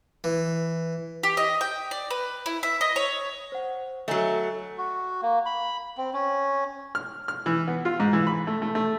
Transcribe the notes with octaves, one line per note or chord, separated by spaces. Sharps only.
E3
G4
D#5
G5
D5
B4
E4
E5
D#5
C#5
C5 F#5
F#3 A3 D#5 G#5 A#5
F#4
A#3
B5
C4
C#4
F6
F6
E3
B3
F4
G#2
E3
B5
A3
A3
A3